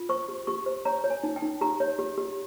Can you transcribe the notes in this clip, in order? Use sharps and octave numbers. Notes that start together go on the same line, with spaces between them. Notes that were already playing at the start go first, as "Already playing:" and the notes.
Already playing: F4
C5 C#6
G4
G4 C#6
C5
C#5 A#5
C#5
G#5
D#4
G5
D#4
G4 A#5
C#5
G4
G4